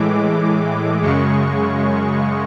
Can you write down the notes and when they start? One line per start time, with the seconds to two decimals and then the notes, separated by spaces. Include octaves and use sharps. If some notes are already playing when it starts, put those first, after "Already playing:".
Already playing: A2 E3 G#3 D6
1.02 F#2 C#3 G#3 C#6